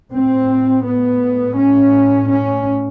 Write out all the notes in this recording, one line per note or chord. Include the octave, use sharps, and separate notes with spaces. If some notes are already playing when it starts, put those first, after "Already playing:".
A2 C4
B3
C#4
C#4